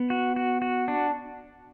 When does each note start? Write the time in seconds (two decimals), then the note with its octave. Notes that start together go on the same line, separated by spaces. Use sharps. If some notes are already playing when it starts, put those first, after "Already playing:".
Already playing: B3
0.10 F#4
0.36 F#4
0.62 F#4
0.88 D4